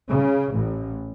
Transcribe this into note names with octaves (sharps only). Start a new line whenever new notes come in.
C#3
A1